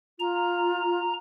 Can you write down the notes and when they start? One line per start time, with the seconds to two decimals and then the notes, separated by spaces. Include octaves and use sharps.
0.19 F4 A#5